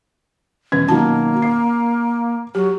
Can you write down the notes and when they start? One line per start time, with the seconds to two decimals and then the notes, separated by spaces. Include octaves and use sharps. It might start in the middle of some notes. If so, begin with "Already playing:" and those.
0.72 E1 C#4 B4 G#6
0.89 B2 D#3 F#3 A#3 A5
1.42 D6 C7
2.55 F#3 G4